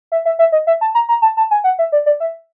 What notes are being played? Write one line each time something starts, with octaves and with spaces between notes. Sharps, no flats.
E5
E5
E5
D#5
E5
A5
A#5
A#5
A5
A5
G#5
F#5
E5
D5
D5
E5